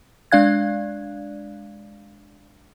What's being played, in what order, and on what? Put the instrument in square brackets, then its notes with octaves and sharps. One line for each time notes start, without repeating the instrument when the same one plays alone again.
[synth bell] G#3 D4 D5 F5 F#6 G#6